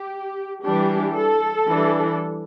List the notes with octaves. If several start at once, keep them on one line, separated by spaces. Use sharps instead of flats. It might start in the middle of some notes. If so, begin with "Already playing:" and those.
Already playing: G4
E3 G3 D4 G4
A4
E3 G3 D4